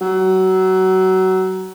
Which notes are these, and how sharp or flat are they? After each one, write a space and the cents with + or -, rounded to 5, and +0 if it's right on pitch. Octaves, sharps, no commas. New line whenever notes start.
F#3 +20